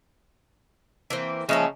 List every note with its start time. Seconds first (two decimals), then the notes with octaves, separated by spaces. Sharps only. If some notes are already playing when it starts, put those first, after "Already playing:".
1.10 E3 A#3 C4
1.49 C#3 F3 G#3 A#3 C#4 D#5 E5